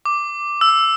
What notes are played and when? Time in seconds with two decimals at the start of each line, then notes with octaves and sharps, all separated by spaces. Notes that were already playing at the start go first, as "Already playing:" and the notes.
0.05 D6
0.61 E6